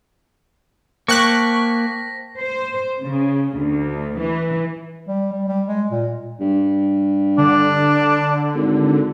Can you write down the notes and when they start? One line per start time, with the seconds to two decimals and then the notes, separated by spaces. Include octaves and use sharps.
1.08 A#3 C5 G5 A5 C#6 F#6 A#6 B6
2.39 C5
3.03 C#3
3.57 D2
4.18 E3
5.07 G3
5.33 G3
5.48 G3
5.67 G#3
5.91 A#2
6.40 G2
7.38 D3 D4
8.55 G#1